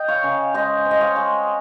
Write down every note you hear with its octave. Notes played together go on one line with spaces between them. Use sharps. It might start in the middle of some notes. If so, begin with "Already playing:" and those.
Already playing: D#5 G5
C#5 F5
C#3
G#3 C5 D#5
C4
D#5
C#5 F5
G#3